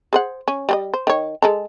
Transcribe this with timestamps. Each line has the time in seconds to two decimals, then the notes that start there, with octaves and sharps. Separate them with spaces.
0.13 G#4 C5 F#5
0.48 C#4
0.69 G3 G4 D#5
0.94 C5
1.07 D#3 C#5
1.42 G#3 A4 A#5